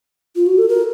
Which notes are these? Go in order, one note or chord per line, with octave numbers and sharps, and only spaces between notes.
F4
F#4
A4
A#4